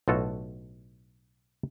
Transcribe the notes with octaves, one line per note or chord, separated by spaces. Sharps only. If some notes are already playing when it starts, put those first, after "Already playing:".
B1 A2 F4 F#4 A4